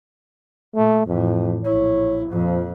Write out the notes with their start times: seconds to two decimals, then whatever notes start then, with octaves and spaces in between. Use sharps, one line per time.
0.75 A#2 A3
1.07 F2 A2 E3
1.65 A#1 E4 C#5
2.29 F2 A#2 F3